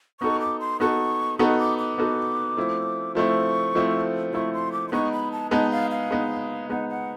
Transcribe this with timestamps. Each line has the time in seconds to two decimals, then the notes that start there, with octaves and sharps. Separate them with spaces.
0.20 B3 D#4 F#4 A4 C#6
0.40 D6
0.60 C6
0.80 B3 D#4 F#4 A4 C#6
1.39 B3 D#4 F#4 A4 C#6
1.59 D6
1.78 D6
1.98 B3 D#4 F#4 A4
2.57 F3 A3 C4 E4
3.15 F3 A3 C4 E4 C#6
3.75 F3 A3 C4 E4
4.33 F3 A3 C4 E4 C#6
4.53 C6
4.72 D6
4.88 C6
4.92 G#3 B3 D#4 C#6
5.12 B5
5.32 A5
5.51 G#3 B3 D#4 A5
5.71 F5
5.91 F5
6.11 G#3 B3 D#4
6.69 G#3 B3 D#4 F#5
6.89 F#5